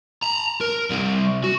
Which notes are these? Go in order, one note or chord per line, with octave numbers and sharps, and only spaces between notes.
A5 A#5
A#4
G3 C4
F#4